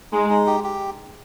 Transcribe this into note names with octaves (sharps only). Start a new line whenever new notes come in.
G#3 D#4
D#4
G4
G4